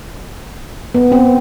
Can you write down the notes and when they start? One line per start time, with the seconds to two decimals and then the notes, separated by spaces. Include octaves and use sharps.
0.95 B3
1.12 C4